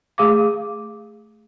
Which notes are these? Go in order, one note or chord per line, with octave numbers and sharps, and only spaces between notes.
A3 G#4 F5 D6